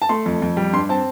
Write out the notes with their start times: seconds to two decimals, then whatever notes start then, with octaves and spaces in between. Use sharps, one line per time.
0.02 A5
0.09 A3 C6
0.26 F2
0.42 F2
0.57 G3
0.73 G2 C6
0.89 C4 A5